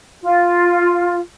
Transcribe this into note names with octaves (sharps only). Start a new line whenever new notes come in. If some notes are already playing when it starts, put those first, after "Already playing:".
F4